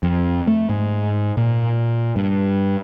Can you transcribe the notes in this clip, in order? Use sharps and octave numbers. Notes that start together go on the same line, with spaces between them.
F2
A3
G#2
A#2
G2